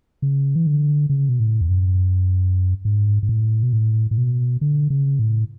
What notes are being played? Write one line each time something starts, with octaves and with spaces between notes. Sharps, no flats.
C#3
E3
D3
C#3
B2
A2
E2
F#2
G#2
G#2
A2
B2
A2
A2
B2
D3
C#3
A2